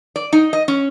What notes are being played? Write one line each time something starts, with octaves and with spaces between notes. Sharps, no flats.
D5
D#4
D#5
C#4